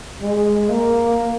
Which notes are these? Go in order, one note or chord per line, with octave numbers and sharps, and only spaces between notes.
G#3
A#3